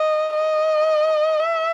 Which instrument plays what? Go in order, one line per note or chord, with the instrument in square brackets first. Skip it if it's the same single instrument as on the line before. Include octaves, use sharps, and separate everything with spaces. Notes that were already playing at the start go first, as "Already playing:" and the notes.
Already playing: [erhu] D#5
D#5
E5